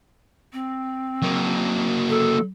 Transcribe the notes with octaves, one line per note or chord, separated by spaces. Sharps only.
C4
F#3 A#3
A4